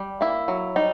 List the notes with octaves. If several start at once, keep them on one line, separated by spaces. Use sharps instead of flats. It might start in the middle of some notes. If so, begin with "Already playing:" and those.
Already playing: G3
A#3 E4
F#3
G3 D#4